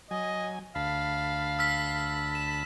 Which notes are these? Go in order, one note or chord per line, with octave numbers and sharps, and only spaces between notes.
F#3 D#5 G#5
D2 F5 A5 B5
E6 F6 B6
E7